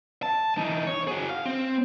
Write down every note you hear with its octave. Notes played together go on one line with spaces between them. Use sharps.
A5
E3 D#4
C#5
F#4 G#4
F5
C4